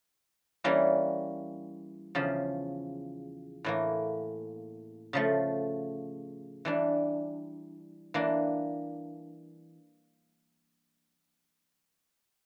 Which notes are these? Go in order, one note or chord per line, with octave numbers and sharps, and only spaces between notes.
E3 G3 A#3 C#4
E2 C#3 F3
A2 E3 A#3
C#3 F3 A3
E3 G3 D4
E3 A#3 D4